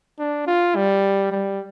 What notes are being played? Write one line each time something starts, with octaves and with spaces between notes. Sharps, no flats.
D4
F4
G3
G3